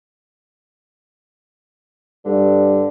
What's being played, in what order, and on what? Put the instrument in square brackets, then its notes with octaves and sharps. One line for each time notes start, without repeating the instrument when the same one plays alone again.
[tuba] G2 [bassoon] D3